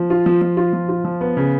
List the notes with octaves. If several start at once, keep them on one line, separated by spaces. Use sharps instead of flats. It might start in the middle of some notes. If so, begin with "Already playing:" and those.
Already playing: F3
F4
F3
F3
F4
F3
F4
F3
B3
C#3